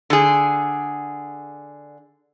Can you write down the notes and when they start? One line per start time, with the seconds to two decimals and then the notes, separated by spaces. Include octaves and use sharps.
0.10 D3 G#4